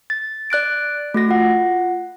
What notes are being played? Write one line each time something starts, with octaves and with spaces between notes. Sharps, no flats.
A6
D5 F#6 A6 D7
A3 F#4 A#6
F4 F#5